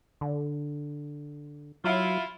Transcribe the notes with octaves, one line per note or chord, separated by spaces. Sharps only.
D3
F#3 E4 F4